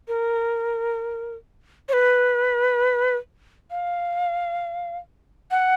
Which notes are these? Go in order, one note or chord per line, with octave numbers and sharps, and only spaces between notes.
A#4
C#5
B4
F5
F#5